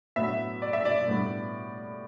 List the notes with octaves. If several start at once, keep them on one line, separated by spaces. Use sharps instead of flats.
A2 F#3 B3 D4 E5
D5
E5
D5
A2 G3 B3 D4